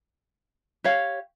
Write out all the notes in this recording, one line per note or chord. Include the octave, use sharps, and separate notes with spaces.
G4 C#5 F5